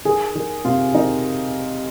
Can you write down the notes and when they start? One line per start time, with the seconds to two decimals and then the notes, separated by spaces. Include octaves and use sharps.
0.05 D#3 G#4
0.35 D#3
0.65 C3 F4
0.95 D#3 D#4